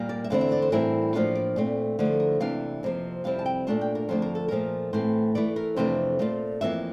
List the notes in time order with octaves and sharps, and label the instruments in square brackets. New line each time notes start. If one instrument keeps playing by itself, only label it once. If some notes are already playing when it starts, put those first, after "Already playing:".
Already playing: [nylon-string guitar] A#2 G3 A#3
D5
E5
E2 D3 A3 C4 E4 F5
E5
D5
C5
A2 E3 G3 C4 E4 A#4
A2 F3 A#3 D4 F4
D5
A#2 A3 C4
D3 F3 A3 E4
A#4
C3 E3 A#3 D4 F5
F2 C3 F3 A#3
F2 C3 G3 C4 E4 F5
A5
G5
A#2 A3 D4 F4 A5
G5
A#4
F2 D3 F3 A3 D4 C5
A#4
A4
A#2 F3 A3 A#4
A2 E3 A3 C4 C5
E3 A3 E4 D5
A#4
F2 C3 E3 A3 D4 C5
A#2 A3 C4 F4
F2 E3 A#3 D4 F4 E5